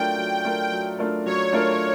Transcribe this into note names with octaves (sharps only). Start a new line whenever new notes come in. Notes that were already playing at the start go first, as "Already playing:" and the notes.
Already playing: F#3 A3 D4 F4 A#4 G5
F#3
A3 D4 F4 A#4
F#3
A3 D4 F4 A#4
F#3 C#5
A3 D4 F4 A#4